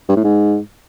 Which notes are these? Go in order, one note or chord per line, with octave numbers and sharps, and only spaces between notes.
G2
A2
G#2